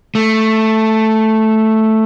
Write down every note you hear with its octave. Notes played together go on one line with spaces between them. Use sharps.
A3